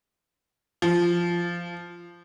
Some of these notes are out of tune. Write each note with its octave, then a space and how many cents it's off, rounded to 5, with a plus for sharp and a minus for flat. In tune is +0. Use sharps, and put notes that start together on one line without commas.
F3 -10